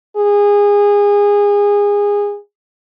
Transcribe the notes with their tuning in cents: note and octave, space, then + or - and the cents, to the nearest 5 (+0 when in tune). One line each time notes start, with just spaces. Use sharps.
G#4 -25